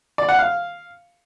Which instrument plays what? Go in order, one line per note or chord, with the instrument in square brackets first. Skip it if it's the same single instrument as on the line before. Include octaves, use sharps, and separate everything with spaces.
[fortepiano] D5
F#5
F5